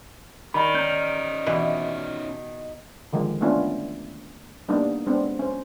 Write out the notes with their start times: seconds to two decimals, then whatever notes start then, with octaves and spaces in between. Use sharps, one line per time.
0.54 D#3 G3 B5
0.75 C#4 D#4 A#5 F6 G6
1.46 B2 E3
3.13 D3 D#3 F3 G#3
3.41 A3 B3 C#4 D4 E4 F4
4.68 G3 A#3 B3 D4 D#4
5.06 G#3 B3 C4 D4
5.39 C#4 C5